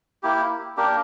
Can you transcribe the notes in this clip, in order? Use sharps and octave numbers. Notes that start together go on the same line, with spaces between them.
A#3 E4 G4
A#3 D4 G4 A#4